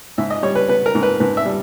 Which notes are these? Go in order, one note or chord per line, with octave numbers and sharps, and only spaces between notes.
G#2 E5
D#5
G3 C#5
B4
B3 B4
A#4
G#2
B4
G#2 B4
E5
G3